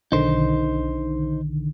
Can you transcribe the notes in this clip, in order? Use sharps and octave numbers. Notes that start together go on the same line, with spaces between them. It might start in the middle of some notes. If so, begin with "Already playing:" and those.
B1 D3 D#3 D#4 C5